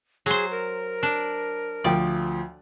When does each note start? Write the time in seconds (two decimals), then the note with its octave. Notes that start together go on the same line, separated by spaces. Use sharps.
0.26 F#3 G#4 C5
0.51 A#4
1.03 D4
1.84 D2 F3 D5 G5